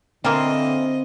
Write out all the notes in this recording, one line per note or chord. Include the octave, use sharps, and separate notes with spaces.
D3 E3 A#3 C4 F4 D#5